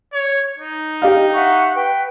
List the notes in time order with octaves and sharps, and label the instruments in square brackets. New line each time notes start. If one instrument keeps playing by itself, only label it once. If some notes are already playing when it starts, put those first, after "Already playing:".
[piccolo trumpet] C#5
D#4
[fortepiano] G4 D#5 F5
[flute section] E5 F#5 C#6
B4 G5